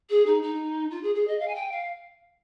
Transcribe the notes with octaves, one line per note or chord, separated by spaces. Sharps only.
G#4
D#4
D#4
F4
G#4
G#4
D#5
F5
G#5
G5
F5